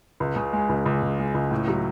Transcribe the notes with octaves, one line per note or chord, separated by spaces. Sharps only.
C#2
C#3
G#3
C#2
C#2
C#3
G#3
C#2
A2
F#3